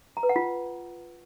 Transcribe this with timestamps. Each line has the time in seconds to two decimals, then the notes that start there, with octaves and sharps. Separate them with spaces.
0.17 A#5
0.23 B4
0.29 F#5
0.36 F4